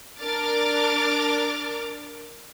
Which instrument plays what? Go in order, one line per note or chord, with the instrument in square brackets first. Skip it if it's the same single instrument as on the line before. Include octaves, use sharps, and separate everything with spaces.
[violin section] D4 A#4 D6 F6 A6 D7